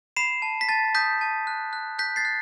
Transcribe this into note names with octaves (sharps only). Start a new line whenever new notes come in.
B5 C7 E7
A5
B6
A5 A6
D#6 G6 B6
A5
F#6
F#6
F#6 G6 B6
A6 C7
F#6